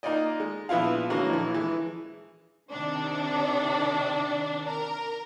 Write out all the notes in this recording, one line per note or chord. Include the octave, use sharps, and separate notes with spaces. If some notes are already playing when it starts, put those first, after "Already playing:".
A#3 D#4 F4 D5 D#5
G#3
A#1 B3 E4 F4 F5
D3 E3 G#3 A#3 C#4 F#4
A#1 E3
E3 G#3
C3 D#3 D4
A#4